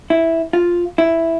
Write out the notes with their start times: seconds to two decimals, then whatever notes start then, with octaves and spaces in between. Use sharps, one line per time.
0.10 E4
0.53 F4
0.98 E4